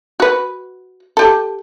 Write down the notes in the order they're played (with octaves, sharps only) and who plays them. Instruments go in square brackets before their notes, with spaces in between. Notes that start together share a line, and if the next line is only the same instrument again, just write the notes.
[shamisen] F#4 B4
G4 A4